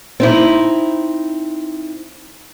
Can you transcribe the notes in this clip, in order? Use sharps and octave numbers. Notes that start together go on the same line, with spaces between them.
C4 D#4 E4